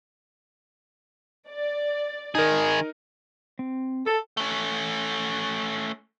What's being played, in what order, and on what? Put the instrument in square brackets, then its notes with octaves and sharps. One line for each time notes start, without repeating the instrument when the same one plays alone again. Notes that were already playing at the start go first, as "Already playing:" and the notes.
[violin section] D5
[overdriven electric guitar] D#3 G#4 [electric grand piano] D#4 A#4
[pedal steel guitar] C4
[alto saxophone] A4 [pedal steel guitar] A5 E6
[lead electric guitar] A3 C#4